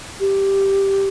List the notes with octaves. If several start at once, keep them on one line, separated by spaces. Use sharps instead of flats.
G4